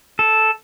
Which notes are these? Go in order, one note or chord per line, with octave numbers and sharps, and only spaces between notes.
A4